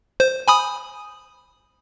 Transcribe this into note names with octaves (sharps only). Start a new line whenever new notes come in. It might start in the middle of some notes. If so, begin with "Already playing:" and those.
C5
G#5 B5 D#6